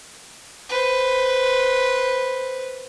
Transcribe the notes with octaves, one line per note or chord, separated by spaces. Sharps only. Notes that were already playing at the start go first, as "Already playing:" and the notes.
B4 C5